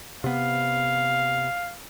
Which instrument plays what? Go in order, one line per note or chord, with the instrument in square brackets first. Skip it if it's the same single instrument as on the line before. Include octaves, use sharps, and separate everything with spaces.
[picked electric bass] C3 B3 [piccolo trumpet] F5